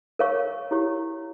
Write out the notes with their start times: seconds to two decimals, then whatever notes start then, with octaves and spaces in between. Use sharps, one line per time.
0.19 A#4 C#5 F5 C#6
0.71 E4 G4 C#5